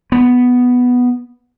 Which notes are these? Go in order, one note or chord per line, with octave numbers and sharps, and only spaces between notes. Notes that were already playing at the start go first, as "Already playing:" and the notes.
B3